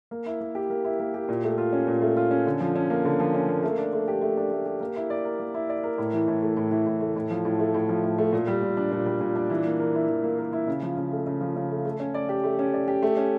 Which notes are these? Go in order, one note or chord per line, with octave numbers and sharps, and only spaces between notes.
A#3
E4
A#3
G4
A#3
E4
A#3
G4
A#2
A3
F4
C#4
A#2
A3
F4
C#4
D3
F3
C#4
A#3
D3
F3
C#4
A#3
A3
D4
A3
G4
A3
D4
A3
G4
A#3
E4
D5
A#4
A#3
E4
D5
A#4
A2
E3
A2
A3
A2
E3
A2
A3
A2
F3
A2
A3
A2
F3
A2
A3
A#2
G3
A#2
D4
A#2
G3
A#2
D4
E3
A#3
A#4
E4
E3
A#3
A#4
E4
C#3
F3
C#3
A3
C#3
F3
C#3
A3
A3
C#4
D5
G4
A3
C#4
D5
G4
A3
C#4